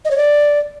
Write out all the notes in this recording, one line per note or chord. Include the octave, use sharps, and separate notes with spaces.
D#5
C#5
D5